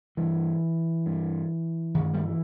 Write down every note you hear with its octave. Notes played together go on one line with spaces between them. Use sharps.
G2 E3
G2
G2 D#3
G3
E3